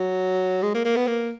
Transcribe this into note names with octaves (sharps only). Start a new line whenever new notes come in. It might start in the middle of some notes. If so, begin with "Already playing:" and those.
Already playing: F#3
G#3
A#3
A#3
B3
A#3